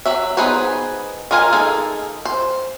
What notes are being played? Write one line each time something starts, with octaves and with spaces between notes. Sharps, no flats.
F#3 F#4 E5
B3 D#4 G#4 B4 C5
G#3 F4 A#4 F5 G#5
A#3 D#4 G#4 A4
C5